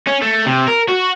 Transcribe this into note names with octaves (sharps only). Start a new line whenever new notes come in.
C#4
A3
C3
A#4
F#4